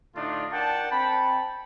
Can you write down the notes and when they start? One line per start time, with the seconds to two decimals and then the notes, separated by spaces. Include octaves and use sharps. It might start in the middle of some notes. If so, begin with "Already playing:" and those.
0.16 A2 D3 A3 D4 D#4 F4
0.52 A#4 D5 F#5 G5 A5
0.92 C4 G5 A5 B5